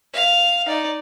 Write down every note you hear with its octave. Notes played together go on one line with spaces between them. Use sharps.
F5
D#4 D5